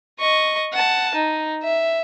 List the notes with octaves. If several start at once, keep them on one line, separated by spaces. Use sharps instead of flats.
D#5 C#6
F#5 A5
D#4
E5